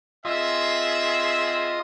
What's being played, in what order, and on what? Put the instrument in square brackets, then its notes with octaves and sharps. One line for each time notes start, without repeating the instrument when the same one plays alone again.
[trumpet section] C4 G#4 E5 [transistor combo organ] F4 D#5